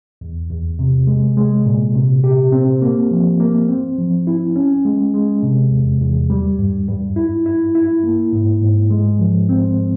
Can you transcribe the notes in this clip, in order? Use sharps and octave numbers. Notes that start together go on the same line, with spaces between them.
E2
E2
C3
G#3
G#3
A#2
C3
G4
C4
A#3
F3
A#3
C4
F3
E4
C#4
G#3
G#3
C3
E2
E2
G3
G2
G2
E4
E4
E4
A#3
G#2
G#2
G#3
F3
C4